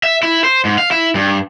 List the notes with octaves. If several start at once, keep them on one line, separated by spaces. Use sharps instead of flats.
E5
E4
C5
G#2
F5
E4
G2